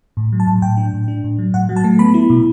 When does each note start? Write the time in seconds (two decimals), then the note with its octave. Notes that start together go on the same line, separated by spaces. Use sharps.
0.17 A2
0.32 F#3
0.40 A5
0.47 A2
0.62 A2 G5
0.77 D4
0.93 A2
1.08 D4
1.24 A2
1.39 F#3
1.54 A2 F#5
1.69 F#3
1.76 A5
1.84 A3
1.99 B3 B5
2.14 E4
2.30 B2